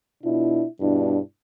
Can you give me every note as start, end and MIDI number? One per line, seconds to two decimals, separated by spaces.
0.22 0.64 47
0.22 0.64 62
0.22 0.64 64
0.22 0.64 65
0.80 1.19 43
0.80 1.19 47
0.80 1.19 62
0.80 1.19 64